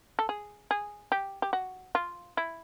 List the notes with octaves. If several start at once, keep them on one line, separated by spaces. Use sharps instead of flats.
A4
G#4
G#4
G4
G4
F#4
F4
E4